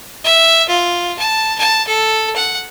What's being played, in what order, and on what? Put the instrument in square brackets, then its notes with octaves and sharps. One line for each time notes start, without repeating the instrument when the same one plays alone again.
[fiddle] E5
F4
A5
A5
A4
F#5